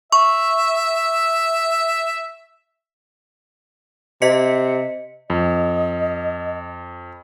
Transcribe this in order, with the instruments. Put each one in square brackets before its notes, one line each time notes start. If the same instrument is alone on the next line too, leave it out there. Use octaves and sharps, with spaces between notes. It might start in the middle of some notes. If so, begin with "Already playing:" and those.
[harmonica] E5 [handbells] C#6
[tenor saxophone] C3 [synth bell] D#5 B6 C#7
[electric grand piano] F2 [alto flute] D#5